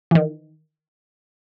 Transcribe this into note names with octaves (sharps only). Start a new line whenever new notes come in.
D#3 E3